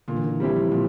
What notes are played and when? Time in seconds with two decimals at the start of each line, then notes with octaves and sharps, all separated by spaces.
0.08 A#2 D3
0.16 E3
0.24 D#3
0.40 E3 G3 C4 E4 G4
0.56 F3
0.72 A#2 F3